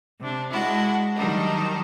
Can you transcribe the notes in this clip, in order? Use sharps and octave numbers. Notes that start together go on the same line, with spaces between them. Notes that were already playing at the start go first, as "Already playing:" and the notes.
C3 D4
G#3 D4 E4 F#4
D#3 F#3 G3 D4 D#4